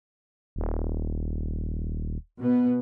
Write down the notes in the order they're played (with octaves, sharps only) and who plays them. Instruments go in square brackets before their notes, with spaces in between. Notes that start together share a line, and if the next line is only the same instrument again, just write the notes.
[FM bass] D#1
[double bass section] B2 B3